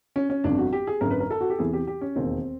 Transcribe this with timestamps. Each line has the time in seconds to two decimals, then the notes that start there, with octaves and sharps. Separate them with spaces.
0.16 C#4
0.30 C#4
0.44 G1 F2 C3 D4
0.58 F#4
0.73 G4
0.87 G#4
1.01 G#1 F#2 D3 A#4
1.10 B4
1.20 A#4
1.31 A4
1.41 F#4
1.50 G4
1.59 E2 C3 E3 G#4
1.73 G4
1.87 G4
2.01 C#4
2.16 E1 D#2 D#3 C4